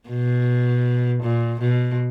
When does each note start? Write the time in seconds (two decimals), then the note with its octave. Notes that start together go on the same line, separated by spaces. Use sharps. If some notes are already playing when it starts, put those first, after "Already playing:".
0.09 B2
1.23 A#2
1.60 B2